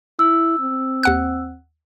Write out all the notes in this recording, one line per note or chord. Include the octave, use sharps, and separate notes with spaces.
E4 E6
C4
D#2 F#5 F#6